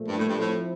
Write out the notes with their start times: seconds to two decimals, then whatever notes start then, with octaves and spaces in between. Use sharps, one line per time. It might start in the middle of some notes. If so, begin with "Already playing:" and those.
Already playing: A#2 F3 A3
0.08 G2
0.18 A2
0.28 G2
0.38 A2 F3 C4 E4